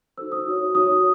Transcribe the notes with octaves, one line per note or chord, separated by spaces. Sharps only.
D#4 F#4 A4 C5 E6
D#6
D#4 F#4 C#5
D#4 F#4 C#5 D#6